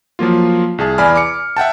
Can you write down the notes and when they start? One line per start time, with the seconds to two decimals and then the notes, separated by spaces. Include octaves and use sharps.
0.19 F3 F#3 A#3 F4
0.78 C2 G#4 A5
0.98 E2 D5 G#5 B5 F6
1.16 D6 C#7
1.57 E5 F#5 G5 A5